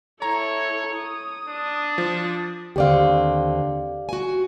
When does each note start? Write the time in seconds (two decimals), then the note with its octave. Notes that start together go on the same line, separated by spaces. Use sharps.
0.22 E4 A4 C#5 A#5
0.98 D#6
1.48 D4
1.98 F3
2.76 D#2 D3 C4 G4 D5 F5
4.09 F#4 G#5